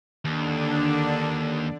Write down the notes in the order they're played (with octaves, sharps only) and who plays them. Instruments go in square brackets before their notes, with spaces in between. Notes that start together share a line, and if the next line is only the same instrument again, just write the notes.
[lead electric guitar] D#2 [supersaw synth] D3 D4